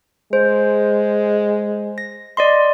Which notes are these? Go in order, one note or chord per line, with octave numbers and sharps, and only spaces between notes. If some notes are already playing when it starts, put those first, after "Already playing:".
G#3 C5
A#6
D5 D#5 C6